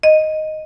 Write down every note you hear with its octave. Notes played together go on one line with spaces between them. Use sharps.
D#5